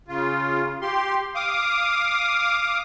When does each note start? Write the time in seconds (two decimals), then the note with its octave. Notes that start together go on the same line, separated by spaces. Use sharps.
0.08 C#3 F4
0.82 G4 C6
1.35 F5 D6 D#6